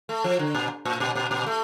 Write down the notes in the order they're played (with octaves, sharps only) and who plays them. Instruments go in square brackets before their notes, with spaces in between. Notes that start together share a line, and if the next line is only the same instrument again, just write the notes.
[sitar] A3
F3
D3
A#2
A2
A#2
A#2
A#2
A3